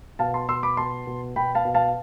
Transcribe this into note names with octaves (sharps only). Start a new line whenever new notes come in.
B2 F5 A5
A5 C6
B2 C6 E6
B5 D6
B2 A5 C6
B2
B2 G5 B5
F5 A5
B2
F5 A5